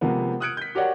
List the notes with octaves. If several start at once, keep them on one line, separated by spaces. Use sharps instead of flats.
C3 F3 G#3 A#3 B3
D#6 F6 F#6 G#6 C#7 D7
G6 B6
F#4 G4 A#4 C#5 D5 F#5